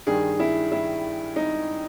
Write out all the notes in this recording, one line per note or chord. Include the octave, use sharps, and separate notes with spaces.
G2 D#3 G#4
E4
E4
D#4